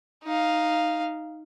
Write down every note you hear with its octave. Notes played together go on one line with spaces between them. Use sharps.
D#4 F5